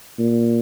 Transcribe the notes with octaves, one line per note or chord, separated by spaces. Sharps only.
A#2